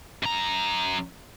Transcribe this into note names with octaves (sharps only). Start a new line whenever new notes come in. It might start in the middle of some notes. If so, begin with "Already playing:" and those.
F#2 A#5